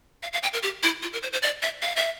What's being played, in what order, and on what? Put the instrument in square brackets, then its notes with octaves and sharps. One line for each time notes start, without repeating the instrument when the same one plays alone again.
[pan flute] F5
F5
G5
A#4
G4
E4
F4
A#4
C5
C5
D5
E5
F5
E5